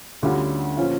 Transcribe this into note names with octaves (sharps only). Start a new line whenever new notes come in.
D2 D3 G3 C#4 F4
A#2 F3 C#4 F4